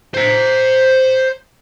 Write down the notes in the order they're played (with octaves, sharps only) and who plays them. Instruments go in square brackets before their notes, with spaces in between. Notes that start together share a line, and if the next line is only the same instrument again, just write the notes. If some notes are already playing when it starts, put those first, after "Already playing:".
[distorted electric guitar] C5 A#5